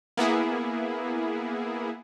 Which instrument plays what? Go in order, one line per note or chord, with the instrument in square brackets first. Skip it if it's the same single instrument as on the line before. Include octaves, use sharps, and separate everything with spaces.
[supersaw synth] A#3 B3 E4 G#4